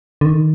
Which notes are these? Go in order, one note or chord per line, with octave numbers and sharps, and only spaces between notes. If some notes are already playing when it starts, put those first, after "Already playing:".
D3
D#3